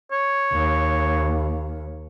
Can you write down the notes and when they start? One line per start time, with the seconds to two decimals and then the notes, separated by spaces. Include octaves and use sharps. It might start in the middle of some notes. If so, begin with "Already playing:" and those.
0.12 C#5
0.53 D#2